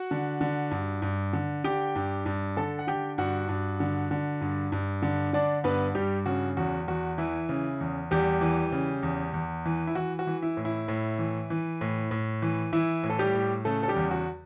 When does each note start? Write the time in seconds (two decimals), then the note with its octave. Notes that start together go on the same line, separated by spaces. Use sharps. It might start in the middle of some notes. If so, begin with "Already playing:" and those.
Already playing: F#4 F#5
0.11 D3
0.41 D3
0.71 G2
1.02 G2
1.33 D3
1.64 D3 G4 G5
1.96 G2
2.26 G2
2.57 D3 A4 A5
2.79 F#5
2.87 D3 G4 G5
3.18 G2 F#4 F#5
3.49 G2
3.80 D3
4.11 D3
4.41 G2
4.72 G2
5.02 D3
5.33 D3 D4 D5
5.64 G2 B3 B4
5.95 G2 G3 G4
6.26 C#3 F#4
6.57 E2 F#4
6.88 E2 F#4
7.18 E3 E4
7.49 C#3
7.81 E2
8.11 E2 G3 G4
8.41 E3
8.72 C#3
9.03 E2
9.34 E2
9.65 E3
9.87 E4
9.95 E3 F#4
10.19 F#4
10.27 E3
10.42 E4
10.57 A2
10.65 E4
10.88 A2
11.19 E3
11.50 E3
11.81 A2
12.11 A2
12.42 E3
12.73 E3 E4
13.03 A2
13.10 A4
13.19 G3 G4
13.34 A2
13.65 C#3 A3 A4
13.83 A4
13.88 G3 G4
13.96 E2
14.11 F#4